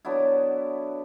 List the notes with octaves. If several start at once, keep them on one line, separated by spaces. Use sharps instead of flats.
D3 F#3 B3 E4